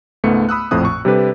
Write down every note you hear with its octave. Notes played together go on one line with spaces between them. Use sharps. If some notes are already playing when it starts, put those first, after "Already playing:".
C#2 G#2 A3 B3 C#7
B5 D#6 E6 F#6
A#1 F2 A2 C4 D#6 F#6
C#6
C3 G3 D4 G4 A4 B4